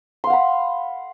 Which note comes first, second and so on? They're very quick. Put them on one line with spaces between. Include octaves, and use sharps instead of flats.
C6 F5 F#5 B5